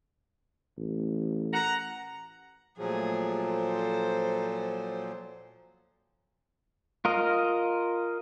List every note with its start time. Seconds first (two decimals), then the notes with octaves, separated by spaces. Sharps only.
0.78 A1
1.53 F#5 A#5
2.78 A#2 F3 F#3 A3 G#4
3.45 A4 C5
7.05 F4 A#4 D#5